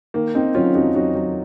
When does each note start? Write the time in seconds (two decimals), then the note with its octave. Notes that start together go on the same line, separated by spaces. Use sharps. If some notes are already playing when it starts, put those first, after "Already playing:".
0.14 D#3 A#3
0.35 D#3 C4 D#4
0.55 F#3 C#4 F4
0.75 F2 D#4 F#4
0.95 F#3 D#4 F#4
1.15 F#3